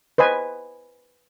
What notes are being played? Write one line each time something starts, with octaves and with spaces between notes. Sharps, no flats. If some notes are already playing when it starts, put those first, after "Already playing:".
B4 C5 D#5 G#5